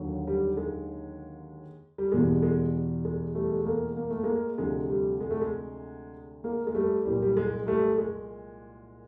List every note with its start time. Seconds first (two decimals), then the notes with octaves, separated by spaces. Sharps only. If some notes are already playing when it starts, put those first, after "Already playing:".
Already playing: D#2 D3 F#3
0.28 G3
0.57 G#3
1.98 G3
2.12 E2 B2 G3 G#3
2.42 G#3
3.05 G#3
3.35 G3 A3
3.50 G#3
3.59 A3
3.66 G#3 A#3
3.97 A#3
4.10 A3
4.23 G#3 A#3
4.58 D2 C3 F3 G#3
4.90 G3
5.20 G#3
5.30 A3
5.41 G#3
6.44 G#3 A#3
6.67 G#3
6.75 G3 A3
7.05 C2 A#2 F#3 G3
7.22 G3
7.37 G#3
7.67 G3 A3
7.98 G#3